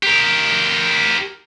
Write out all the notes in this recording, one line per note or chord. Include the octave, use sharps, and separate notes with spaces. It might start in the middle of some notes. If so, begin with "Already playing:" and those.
G4 A#4